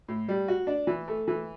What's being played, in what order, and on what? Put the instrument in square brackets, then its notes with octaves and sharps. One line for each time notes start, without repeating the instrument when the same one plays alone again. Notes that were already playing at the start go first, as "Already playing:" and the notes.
[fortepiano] A2
G3
F#4
D4
E3
A3
E3